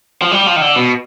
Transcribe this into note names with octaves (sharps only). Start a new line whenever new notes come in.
F3
G3
F3
D#3
D3
B2